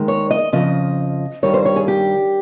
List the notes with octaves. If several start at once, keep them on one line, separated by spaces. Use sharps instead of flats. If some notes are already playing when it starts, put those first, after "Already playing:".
Already playing: D#2 D#3 G#3
C#5
D#5
F2 C#3 F3 D#5
G2 D#3 G3 C#5
C5
C#5
G#4
G4